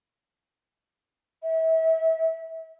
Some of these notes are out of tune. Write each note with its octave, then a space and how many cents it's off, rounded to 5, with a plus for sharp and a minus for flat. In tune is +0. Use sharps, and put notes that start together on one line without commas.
E5 -30